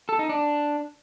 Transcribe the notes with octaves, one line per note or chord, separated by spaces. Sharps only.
A4
D#4
D4